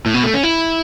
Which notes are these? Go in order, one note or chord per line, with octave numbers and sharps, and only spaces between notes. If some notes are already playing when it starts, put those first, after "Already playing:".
A2
B2
A3
C#4
E4